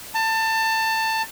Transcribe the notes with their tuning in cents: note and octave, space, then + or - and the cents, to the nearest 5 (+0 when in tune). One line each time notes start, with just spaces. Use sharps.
A5 +20